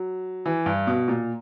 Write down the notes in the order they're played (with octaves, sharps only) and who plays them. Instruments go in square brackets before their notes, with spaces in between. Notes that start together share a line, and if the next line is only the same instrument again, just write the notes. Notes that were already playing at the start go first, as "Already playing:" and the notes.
Already playing: [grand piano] F#3
E3
G2
B2
A#2